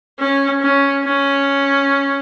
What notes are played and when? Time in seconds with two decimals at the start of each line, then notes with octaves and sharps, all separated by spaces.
0.19 C#4
0.62 C#4
1.04 C#4